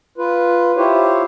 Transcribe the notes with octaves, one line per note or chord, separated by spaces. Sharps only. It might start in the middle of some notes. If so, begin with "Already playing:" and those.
F4 B4
E4 F4 G4 C5 C#5